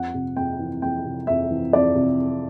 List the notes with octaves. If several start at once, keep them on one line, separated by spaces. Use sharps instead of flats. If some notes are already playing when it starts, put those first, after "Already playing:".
Already playing: F2 F#5
C3
F2 G5
E3
F2 G5
C3
F2 E5
E3
F2 D5
C3